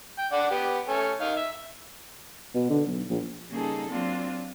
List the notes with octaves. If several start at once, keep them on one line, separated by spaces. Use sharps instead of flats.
G5
D4 D5 F#5
B3 G4
A3 C#4 A4
D#3 D#4 F5
E5
B2
D3
B1
A#1
C#3 G3 A#3 D#4 G#4 A4
F#3 A#3 C4 D4 F4